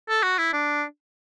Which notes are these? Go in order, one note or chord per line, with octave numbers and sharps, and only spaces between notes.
A4
F#4
E4
D4